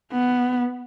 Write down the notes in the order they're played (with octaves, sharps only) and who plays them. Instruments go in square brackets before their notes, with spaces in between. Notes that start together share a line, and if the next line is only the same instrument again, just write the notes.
[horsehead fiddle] B3